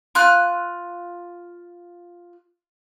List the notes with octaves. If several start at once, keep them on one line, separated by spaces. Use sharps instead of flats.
F4 F6 F#6